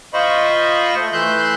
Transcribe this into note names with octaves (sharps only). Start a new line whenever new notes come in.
F4 C5 D#5 B5 C#6
A3
E3 A3 E5 C6 F#6 G6